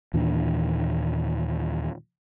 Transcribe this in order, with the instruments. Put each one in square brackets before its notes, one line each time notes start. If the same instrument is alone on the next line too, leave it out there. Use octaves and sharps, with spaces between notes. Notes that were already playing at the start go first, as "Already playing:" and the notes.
[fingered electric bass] D#2 A#2 E3 D4